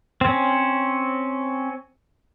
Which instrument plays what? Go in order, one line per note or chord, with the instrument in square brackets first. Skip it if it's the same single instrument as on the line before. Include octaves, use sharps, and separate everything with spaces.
[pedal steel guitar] C4 C#4